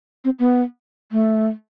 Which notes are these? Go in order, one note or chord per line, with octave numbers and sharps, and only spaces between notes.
C4
B3
A3